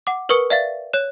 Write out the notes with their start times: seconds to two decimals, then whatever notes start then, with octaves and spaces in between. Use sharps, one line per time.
0.07 F#5 D6
0.29 A#4 B4 C#6 D#6 C#7 F#7
0.50 D5 E5 F5 A6
0.93 C#5 F#6 E7